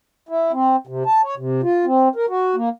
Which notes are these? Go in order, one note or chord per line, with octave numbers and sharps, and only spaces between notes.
E4
C4
C3
A5
C#5
C3
F4
C4
A#4
F#4
A#3